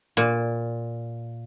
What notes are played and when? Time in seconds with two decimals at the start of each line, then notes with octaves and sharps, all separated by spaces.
0.17 A#2